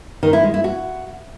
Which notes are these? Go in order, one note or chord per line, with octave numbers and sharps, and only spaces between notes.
D#3
E4
G#3
E4
F#4